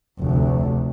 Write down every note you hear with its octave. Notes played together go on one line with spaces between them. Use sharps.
F1 D2